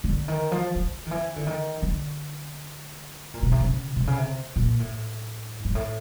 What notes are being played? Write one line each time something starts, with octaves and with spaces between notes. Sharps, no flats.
D3
D#3
F3
F3
D#3
E3
D3
D#3
D3
A#2
B2
C3
C#3
C3
C#3
C3
A#2
A2
G#2
A2